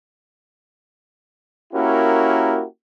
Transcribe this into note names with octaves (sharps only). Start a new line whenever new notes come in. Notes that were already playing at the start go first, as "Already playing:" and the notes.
A#3 C#4 E4 F#4 G4 A#4